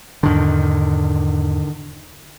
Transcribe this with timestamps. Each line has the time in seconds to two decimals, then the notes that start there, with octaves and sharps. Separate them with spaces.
0.23 E2 G#2 D3 D#3 D4